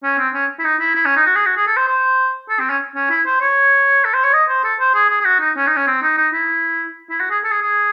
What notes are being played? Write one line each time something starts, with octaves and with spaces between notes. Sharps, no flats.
C#4
C4
C#4
E4
D#4
E4
E4
C#4
D#4
F#4
G#4
F#4
G#4
A4
C5
C5
A4
C4
C#4
C#4
E4
C5
C#5
A4
C5
C#5
D#5
C5
A4
C5
G#4
G#4
G#4
F#4
D#4
C#4
D#4
C#4
C4
D#4
D#4
E4
E4
F#4
G#4
A4
G#4
G#4